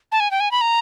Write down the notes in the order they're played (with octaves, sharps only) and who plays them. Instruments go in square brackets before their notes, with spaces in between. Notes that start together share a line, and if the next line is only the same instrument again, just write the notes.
[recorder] A5
G#5
G5
G#5
B5
A#5